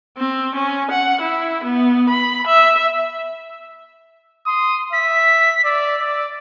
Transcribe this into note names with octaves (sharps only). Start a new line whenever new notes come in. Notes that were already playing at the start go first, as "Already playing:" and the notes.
C4
C#4
F#5
E4
B3
B5
E5
C6 D#6
E5 B6
D5 E6
D5 E6